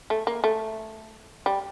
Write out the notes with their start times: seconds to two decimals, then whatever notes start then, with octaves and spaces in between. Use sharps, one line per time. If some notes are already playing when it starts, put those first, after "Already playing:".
0.10 A3
0.27 A#3
0.44 A3
1.46 G3